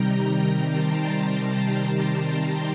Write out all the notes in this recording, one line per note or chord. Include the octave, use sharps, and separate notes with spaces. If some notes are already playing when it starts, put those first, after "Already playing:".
Already playing: C3 D#3 G3 G5 A#5
A5 C6
G5 A#5